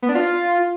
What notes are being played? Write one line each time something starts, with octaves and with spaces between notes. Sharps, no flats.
B3
D4
F4